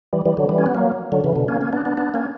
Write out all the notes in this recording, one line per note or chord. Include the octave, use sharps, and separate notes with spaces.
E3 G3
E3 G3
D3 F#3
E3 G3
C#4
B3
F#3 A#3
D3 F#3
C#3 E3
B2 D3
A#3 C#4
A#3 C#4
B3 D4
B3 D4
B3 D4
A#3 C#4